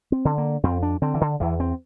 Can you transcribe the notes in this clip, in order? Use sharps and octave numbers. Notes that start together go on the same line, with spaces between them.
C4
D3
A#3
F2 C4
D4
D3 C4
E3
D3
E2 E3
C4